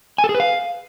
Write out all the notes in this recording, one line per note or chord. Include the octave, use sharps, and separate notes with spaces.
G#5
A4
G#4
B4
F5